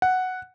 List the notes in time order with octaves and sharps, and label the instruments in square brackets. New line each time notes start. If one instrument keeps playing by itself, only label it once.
[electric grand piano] F#5